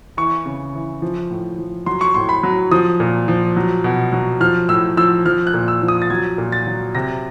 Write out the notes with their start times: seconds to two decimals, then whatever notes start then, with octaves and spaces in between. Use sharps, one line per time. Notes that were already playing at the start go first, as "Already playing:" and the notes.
0.17 E3 C#6
0.46 C#3
0.74 E3
1.02 F3
1.30 A2
1.58 F3
1.86 F#3 C6
2.01 C#6
2.14 A2 C6
2.29 B5
2.43 F#3
2.71 F3 D#6
3.00 A#2
3.28 F3
3.56 F#3
3.84 B2
4.13 F#3
4.40 F3 F6
4.69 A2 E6
4.97 F3 E6
5.25 F3 F6
5.47 F#6
5.54 A#2
5.68 E6
5.82 F3
5.88 D#6
6.02 A6
6.10 F#3 G#6
6.38 A#2
6.52 A6
6.67 F#3
6.95 C3 A#6